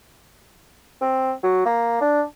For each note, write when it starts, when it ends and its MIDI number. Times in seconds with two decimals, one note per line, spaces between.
1.01 1.32 60
1.43 1.62 54
1.66 2.00 58
2.01 2.22 62